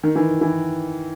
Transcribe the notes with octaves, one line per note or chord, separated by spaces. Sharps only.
D#3
E3
E3